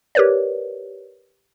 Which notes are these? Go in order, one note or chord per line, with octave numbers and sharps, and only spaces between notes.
G4 A#4 B4 C#5 D5